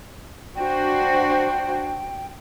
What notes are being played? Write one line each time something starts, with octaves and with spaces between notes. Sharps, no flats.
D4 F#4 C5 G5